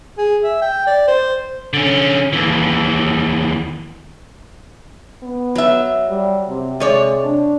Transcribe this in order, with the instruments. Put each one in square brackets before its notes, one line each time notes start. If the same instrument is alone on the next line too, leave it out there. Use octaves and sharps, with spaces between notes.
[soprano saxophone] G#4
E5
G5
D5
C5
[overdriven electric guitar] D3 C#4
D#2 E3
[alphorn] B3
[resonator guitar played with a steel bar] F#3 E5
[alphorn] G3
C3
[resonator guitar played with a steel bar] C3 C#5 D5 [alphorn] G#3
[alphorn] D4